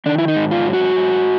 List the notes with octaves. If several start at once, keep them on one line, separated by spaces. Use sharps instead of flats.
D#3 D4
E4
D#4
G#2
F4
F#3
F#4
G#2